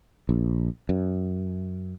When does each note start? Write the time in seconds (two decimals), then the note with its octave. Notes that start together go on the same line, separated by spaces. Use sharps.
0.29 A#1
0.89 F#2